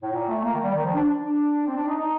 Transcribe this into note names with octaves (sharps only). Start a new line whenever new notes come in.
A2
A#2
A3
A#3
D#3
G3
D#3
F3
D4
D4
C4
D4
D#4
D#4